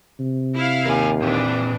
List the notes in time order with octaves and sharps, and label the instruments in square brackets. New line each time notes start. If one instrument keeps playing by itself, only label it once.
[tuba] C3
[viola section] E4 F5
[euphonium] D#2 [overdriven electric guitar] A#4 G#5
[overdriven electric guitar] A#2 C4 [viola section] E3 D4